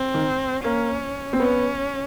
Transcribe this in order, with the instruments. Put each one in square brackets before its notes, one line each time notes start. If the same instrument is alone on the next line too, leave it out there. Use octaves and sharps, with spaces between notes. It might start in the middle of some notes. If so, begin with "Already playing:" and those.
Already playing: [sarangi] C4
[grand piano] D#3
[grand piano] A#3 [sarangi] C#4
[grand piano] C4
[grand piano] B3 [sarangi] C#4